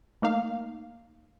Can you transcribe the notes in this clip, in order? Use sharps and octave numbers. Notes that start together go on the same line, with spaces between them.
A3 A#3 D#4 F5